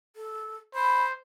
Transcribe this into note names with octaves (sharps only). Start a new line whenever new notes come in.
A4
C5 B5